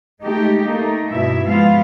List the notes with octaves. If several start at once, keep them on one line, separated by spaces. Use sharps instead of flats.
G#3 A3 D#4 G4
A3 A#3 D#4
G2 B2 E4 E5
F3 G#3 B3 F4 F5